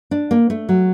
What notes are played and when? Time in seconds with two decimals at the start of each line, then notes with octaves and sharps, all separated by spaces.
0.11 D4
0.31 A#3
0.50 A3
0.69 F#3